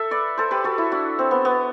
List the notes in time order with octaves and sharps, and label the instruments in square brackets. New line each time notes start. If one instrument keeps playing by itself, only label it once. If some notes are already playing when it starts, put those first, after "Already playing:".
Already playing: [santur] A4 E5
B4 D5
A4 C5
G4 B4
F#4 A4
E4
D4 F#4
C4
B3
B3